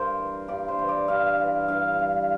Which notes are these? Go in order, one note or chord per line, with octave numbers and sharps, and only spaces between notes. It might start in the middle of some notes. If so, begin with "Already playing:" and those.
Already playing: G2 A#4 C5
E3
G2 D5
C5
E3
D5
G2 F5
E3
G2 F5
G2